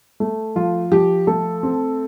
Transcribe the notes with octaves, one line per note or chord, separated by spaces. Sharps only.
A3
F3 F4
F3 G4
A3 A4
C4